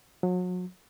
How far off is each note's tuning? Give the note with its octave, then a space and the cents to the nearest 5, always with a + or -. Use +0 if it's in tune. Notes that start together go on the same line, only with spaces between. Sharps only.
F#3 -35